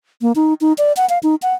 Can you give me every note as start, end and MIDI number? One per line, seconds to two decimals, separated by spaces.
0.22 0.32 58
0.36 0.54 63
0.61 0.73 63
0.78 0.93 74
0.97 1.08 78
1.09 1.19 77
1.23 1.35 63
1.42 1.54 78